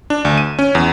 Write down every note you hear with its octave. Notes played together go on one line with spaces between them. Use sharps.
D4
D2
D#7
C#4
E2